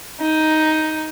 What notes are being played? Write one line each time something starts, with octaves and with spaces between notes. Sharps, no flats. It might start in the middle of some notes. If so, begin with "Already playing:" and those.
D#4